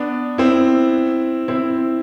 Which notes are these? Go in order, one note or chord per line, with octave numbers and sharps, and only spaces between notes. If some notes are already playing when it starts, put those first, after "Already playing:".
Already playing: B3 D4
C4 E4
C4 E4